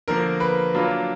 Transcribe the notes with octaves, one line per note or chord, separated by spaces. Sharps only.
D3 F3 A#3 A#4
B4
F#3 A#3 D4 F4